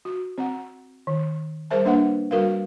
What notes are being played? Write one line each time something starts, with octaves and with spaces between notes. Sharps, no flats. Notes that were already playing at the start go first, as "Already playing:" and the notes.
F#4
C4 F#5
D#3
G3 G#4 A#4 C5 E5 A5
A#3 D4 B4 E5 F#5
G3 F#4 A#4 B4 F5